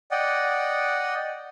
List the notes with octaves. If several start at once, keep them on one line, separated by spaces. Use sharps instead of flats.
D5 D#5 F#5 G5